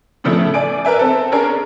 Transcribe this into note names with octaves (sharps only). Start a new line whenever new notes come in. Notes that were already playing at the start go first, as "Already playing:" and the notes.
A2 C#3 F3 A3
D5 G#5 D7
A#4 B4 E5 G#5
C4 A4
C#4 D4 G#4 A#4